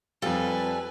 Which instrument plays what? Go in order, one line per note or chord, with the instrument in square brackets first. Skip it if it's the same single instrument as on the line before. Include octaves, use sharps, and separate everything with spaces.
[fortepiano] F2 F4 [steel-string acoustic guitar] G3 [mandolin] A4 [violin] B4 G#5